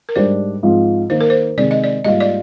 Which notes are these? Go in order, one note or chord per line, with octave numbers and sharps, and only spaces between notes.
A#4
G#2 G3 D4 C5
G#2 F3 C4 F4
D#3 A#3 D#4 C5
A#4
C5
C3 D#3 G#3 C4 D5
D#5
D5
G#2 G3 A#3 F4 D#5
D5